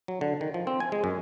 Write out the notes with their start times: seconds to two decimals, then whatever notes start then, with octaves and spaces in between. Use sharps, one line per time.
0.08 F#3
0.21 D3
0.41 D#3
0.54 F3
0.67 C4
0.80 G#5
0.92 G#3
1.04 F#2